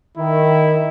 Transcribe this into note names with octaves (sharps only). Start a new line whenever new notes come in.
D#3 E4